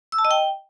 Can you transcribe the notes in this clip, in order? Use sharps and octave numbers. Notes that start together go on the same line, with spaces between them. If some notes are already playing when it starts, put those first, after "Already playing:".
E6
A5
D#5
G5